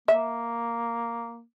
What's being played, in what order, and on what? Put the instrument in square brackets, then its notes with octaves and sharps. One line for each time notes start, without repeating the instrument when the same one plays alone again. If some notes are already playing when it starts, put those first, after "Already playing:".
[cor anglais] A#3 [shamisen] E5